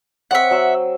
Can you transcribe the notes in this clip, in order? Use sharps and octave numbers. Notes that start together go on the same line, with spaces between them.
C4 C#5 D#5 E5 F#5
F#3 C6 E6